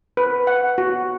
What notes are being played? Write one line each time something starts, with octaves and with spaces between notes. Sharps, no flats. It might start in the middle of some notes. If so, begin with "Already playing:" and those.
B4
F#5
F#4